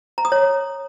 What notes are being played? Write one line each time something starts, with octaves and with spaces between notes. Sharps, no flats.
A#5
D#6
C#5